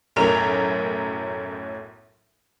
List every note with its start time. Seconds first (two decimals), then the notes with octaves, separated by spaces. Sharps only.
0.16 B1 F#2 A2 F#3 A#4 F7